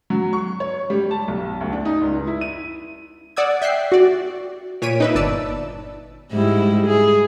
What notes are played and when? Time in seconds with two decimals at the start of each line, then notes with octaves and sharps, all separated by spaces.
0.10 F#3
0.33 C#6
0.60 C#5
0.90 G3
1.11 A5
1.28 B1
1.61 D2
1.73 D4
1.85 D#4
2.02 C#2
2.27 E4
2.41 D#7
3.36 D5 F#5 D#6 E6 G#6
3.62 E5 G5 F#6 C7
3.92 F#4 D5
4.82 A#2 C#5 B6 D7 D#7
5.00 D#4 B4 E5
5.15 G1 D5 A5 E6
6.32 G#2 G3 E4
6.87 G#4